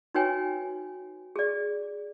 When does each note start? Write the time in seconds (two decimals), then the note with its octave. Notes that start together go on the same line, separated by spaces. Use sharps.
0.14 D#4 F#4 B4 C#5 G5 G#5
1.36 G#4 D5